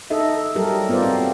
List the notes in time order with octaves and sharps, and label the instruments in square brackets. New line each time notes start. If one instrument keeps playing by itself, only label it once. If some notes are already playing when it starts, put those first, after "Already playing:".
[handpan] D#4 A4 D#5 E5
F#3 G3 G4 A4 A#4
B3 F4 A#4 C5 D5
C4